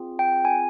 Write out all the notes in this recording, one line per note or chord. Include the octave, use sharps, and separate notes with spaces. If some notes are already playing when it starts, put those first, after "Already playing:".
Already playing: C4 F4 G#4
G5
G#5